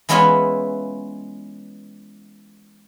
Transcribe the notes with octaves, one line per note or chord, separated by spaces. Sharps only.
E3 G#3 B3 C#4 E4 F4